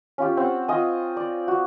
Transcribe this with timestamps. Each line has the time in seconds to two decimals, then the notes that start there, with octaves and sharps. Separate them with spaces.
0.18 C#4 F4 G4
0.37 C4 F#5 C#6
0.68 F4 D#5 G#5
1.17 D5
1.48 F#4